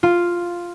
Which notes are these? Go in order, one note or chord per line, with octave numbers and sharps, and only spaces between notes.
F4